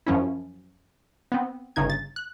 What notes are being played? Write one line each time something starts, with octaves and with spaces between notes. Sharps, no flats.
F#2 F3 C#4 E4
B3 C4
G1 C#3 D#4 G#6
A6
F#6